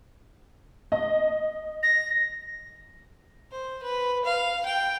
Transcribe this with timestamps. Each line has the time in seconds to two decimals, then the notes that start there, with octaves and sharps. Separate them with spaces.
0.92 D#5
1.83 A#6
3.51 C5
3.82 B4
4.25 F5
4.66 G5